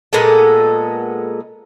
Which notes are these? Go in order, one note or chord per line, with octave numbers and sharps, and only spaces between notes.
A#2 G#3 B3 A4